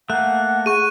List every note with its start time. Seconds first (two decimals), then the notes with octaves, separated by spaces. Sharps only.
0.10 A3 A#3 F#5 F#6
0.66 G#4 C#6 D#7